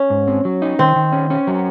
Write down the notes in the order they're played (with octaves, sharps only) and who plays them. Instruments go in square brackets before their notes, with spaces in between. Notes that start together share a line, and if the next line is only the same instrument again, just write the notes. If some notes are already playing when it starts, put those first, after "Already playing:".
Already playing: [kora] C#4
[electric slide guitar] G#2
C4
F#3
D#4
[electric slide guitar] D#3 [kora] C4
[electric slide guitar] D#3
C#4
C#4
F#3